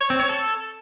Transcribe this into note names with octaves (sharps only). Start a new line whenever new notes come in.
C#5
C4
C#5
A4